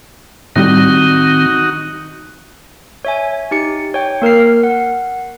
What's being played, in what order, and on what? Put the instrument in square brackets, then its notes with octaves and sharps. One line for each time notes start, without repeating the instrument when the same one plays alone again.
[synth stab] A2 G3 [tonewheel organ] D#3 C4 [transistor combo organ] D#4 F#4
[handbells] C#5 E5 G#5
D#4 G4 C#7
C#5 G5
A#3 A#4 F6 C7
F#5